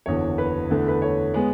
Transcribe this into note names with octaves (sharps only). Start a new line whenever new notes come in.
F#1 E2 D3 C#5
B4
E2 D3 A3
B4
C#5
G#3 B3